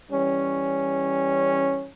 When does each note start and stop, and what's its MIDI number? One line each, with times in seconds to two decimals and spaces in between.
0.11 1.87 52
0.11 1.87 55
0.11 1.87 61